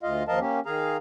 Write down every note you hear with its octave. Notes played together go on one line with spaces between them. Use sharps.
D2 F4 D#5 F5
D#2 F3 A#4 D#5 F5 A5
A#3 C#4 G4
D#3 G#4 F5 A#5